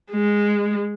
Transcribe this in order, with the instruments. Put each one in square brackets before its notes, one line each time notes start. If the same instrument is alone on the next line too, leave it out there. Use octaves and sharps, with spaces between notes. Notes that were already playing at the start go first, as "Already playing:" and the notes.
[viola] G#3